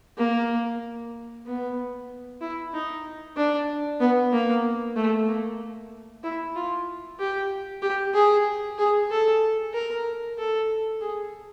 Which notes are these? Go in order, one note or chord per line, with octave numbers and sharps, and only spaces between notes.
A#3
B3
E4
D#4
D4
B3
A#3
A3
A#3
E4
F4
G4
G4
G#4
G#4
A4
A#4
A4
G#4